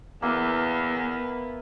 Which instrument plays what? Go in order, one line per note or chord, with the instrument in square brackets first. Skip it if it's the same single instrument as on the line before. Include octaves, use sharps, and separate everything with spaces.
[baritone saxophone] E2 [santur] A#3 E4 B4 [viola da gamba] B3